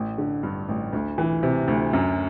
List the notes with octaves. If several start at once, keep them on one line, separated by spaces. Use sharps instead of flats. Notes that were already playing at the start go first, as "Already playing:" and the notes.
Already playing: A1
D3
G2
A1
D2
E3
C3
D2
F#2